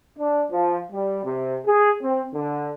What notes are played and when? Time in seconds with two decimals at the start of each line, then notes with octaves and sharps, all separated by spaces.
0.19 D4
0.51 F3
0.91 G3
1.24 C3
1.66 G#4
2.02 C4
2.34 D3